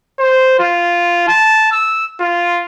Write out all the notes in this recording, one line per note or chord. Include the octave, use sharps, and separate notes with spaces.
C5
F4
A5
E6
F4